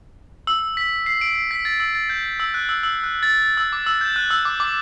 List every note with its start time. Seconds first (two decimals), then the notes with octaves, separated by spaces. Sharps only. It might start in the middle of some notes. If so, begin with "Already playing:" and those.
0.47 E6
0.77 B6
1.06 C7
1.21 D7
1.36 C7
1.51 B6
1.65 A6
1.80 E6
1.95 A6
2.10 G6
2.40 E6
2.54 F#6
2.69 E6
2.83 E6
3.04 F#6
3.23 A6
3.42 A6
3.57 E6
3.73 D6
3.86 E6
4.01 G6
4.16 F#6
4.30 E6
4.45 D6
4.60 D6